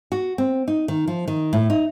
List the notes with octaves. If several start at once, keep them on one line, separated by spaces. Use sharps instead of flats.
F#4
C4
D#4
D#3
F3
D#3
A2
D#4